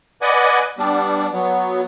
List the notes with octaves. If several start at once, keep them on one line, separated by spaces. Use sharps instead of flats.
B4 D5 D#5 F#5 G#5
G3 B3 D4
F#3 B3